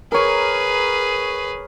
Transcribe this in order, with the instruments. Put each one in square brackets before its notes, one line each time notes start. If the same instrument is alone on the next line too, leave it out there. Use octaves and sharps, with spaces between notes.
[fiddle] G#4 B4 [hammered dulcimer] A#4 C#5